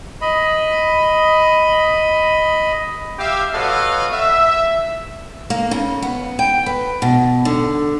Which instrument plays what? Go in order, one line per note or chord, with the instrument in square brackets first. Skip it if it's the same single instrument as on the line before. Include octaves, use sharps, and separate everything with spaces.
[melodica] D#5 B5
[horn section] G4 E5 F5
F#4 A4 B4 C#5 D#5 F5
E5
[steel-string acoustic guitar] A#3
C#3
B3
G5
B4
B2
D3